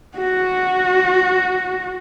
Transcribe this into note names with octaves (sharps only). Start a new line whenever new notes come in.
F#4